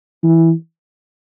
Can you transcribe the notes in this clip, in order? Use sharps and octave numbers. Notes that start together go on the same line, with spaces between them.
E3